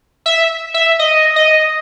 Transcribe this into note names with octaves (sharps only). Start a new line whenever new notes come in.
E5
E5
D#5
D#5